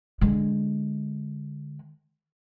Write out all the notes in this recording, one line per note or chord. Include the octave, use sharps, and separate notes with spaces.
D3 G#3